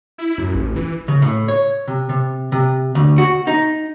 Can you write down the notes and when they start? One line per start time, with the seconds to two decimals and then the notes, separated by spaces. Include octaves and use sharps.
0.18 E4
0.38 F#2
0.55 A1
0.76 E3
1.08 C#3
1.22 A2
1.48 C#5
1.88 C3
2.09 C3
2.52 C3
2.95 D2
3.18 F#4
3.47 D#4